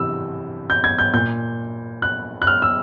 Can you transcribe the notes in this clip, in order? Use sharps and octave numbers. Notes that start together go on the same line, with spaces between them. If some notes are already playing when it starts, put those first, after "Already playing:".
Already playing: C3 E3 E6
G6
G#6
G6
A#2 G6
F#6
F#6
F6
E6